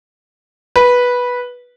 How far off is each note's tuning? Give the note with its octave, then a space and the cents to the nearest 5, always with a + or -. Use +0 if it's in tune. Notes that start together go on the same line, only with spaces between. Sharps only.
B4 -10